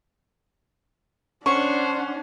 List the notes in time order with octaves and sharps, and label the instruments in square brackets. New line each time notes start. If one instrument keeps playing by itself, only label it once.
[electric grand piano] C#4 [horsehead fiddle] D4 [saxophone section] C5 F#5 [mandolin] C#6